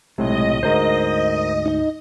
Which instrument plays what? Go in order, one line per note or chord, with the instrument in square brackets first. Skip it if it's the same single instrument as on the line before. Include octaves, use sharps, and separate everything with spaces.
[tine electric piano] B1 A2 C3 [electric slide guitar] G#3 [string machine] D#5
[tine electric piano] D2 G#2 [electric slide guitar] A#4 C5
[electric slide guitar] D#4 D#5